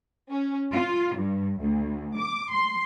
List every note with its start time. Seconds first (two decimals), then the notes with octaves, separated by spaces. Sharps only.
0.31 C#4
0.72 F4
1.16 G2
1.60 D2
2.18 D6
2.51 C6